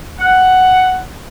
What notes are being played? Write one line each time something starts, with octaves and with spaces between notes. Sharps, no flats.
F#5